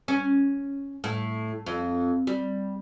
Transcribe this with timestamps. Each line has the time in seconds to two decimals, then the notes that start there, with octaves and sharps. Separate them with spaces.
0.08 C#4
1.04 A2
1.66 F2
2.27 G3